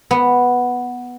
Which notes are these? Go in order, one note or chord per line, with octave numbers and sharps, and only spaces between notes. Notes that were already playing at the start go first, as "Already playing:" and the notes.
B3